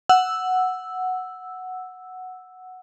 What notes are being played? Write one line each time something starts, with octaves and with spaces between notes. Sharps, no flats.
F#5 E6